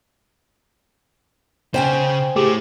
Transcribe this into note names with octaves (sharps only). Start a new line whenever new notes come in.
C#3 C5 G5 G#5
A3 E4 G4 G#4 D6